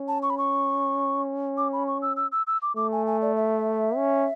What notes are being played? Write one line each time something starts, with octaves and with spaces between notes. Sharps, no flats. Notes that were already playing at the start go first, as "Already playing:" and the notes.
Already playing: C#4
A5
C#6
B5
C#6
D6
B5
C#6
E6
E6
E6
E6
D6
A3 D6
G#5
G#5
D5
E5
C#4